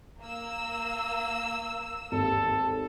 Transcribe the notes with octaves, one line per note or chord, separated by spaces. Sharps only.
A#3 E6
G#1 D#2 A4